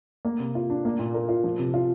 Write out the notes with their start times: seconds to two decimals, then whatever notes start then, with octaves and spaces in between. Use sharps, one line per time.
0.25 A#3
0.40 C3
0.55 F4
0.70 D4
0.85 A#3
0.99 A#2
1.14 A#4
1.29 F4
1.44 F3
1.59 C3
1.74 F4